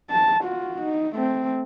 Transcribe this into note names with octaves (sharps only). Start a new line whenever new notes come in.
A5
F4 F#4
D#4
A3 C4